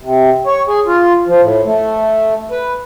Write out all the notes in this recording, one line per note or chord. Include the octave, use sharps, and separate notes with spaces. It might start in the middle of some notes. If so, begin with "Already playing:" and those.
C3
C#5
G#4
F4
F3
A2
A3
B4